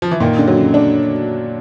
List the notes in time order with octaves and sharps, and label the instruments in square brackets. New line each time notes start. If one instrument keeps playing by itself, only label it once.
[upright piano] F3
E3
[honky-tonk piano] A#2 [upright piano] D#3
[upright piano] D3
[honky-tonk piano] F#3
[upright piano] C#3
[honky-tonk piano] D4